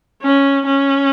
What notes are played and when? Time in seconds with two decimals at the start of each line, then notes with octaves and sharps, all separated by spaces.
0.22 C#4
0.66 C#4